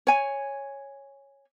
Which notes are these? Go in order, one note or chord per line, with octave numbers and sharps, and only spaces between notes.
C#5 G#5